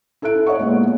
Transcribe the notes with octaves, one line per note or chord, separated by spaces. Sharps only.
E4 A4 E5 F#6 D7
C#5 D#5 E5 F#5 C#6
A#2 G#3 B3